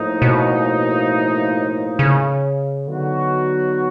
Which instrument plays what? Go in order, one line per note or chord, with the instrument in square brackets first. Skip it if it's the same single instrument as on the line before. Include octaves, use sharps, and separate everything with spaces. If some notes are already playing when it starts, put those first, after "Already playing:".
Already playing: [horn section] A2 F3 A#3 D#4
[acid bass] B2
C#3
[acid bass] D3 [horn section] F#3 B3 D#4 F#4